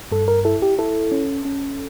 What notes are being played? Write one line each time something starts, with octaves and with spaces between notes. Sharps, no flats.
G2 A4
A#4
E4 A4
G4
E4 A4
C#4
C#4